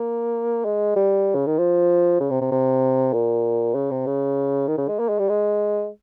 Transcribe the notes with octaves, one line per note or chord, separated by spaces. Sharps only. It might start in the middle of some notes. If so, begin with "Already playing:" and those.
Already playing: A#3
G#3
G3
C#3
D#3
F3
C#3
C3
C3
C3
A#2
C#3
C3
C#3
D#3
C#3
G#3
A#3
G#3
G3
G#3